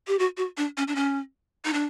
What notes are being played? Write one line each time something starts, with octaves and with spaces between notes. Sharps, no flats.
G4
F#4
F#4
D4
C#4
D4
C#4
D#4
D4